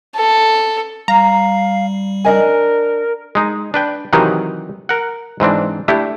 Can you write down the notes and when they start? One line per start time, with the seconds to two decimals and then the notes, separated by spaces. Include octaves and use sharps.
0.17 A4
1.08 G3 F5 A#5
2.25 D4 A#4 D#5 G#5
3.35 G#3 D#4
3.74 D4 B4 G5
4.13 C3 D#3 E3 F#3 D#4 G4
4.89 A#4 F#5
5.40 G#2 E3 C4 D4
5.88 A3 D4 E4 G4